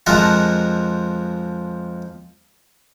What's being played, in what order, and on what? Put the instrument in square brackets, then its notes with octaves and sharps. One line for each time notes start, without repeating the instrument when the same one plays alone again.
[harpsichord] F2 F3 G#3 A#4 F#5 A5